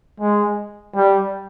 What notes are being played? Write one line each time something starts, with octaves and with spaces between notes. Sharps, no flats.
G#3
G3